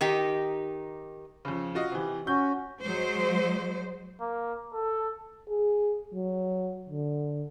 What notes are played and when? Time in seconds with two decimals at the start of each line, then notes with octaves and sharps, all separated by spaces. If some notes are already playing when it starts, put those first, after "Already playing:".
0.01 D#3 D#4 G4
1.45 F2 C#3
1.75 F4 F#4 D#5
1.92 C3 E3
2.27 C#4 F#4 G6
2.82 F#3 G#3 C5
4.21 A#3
4.73 A4
5.49 G#4
6.14 F#3
6.89 D3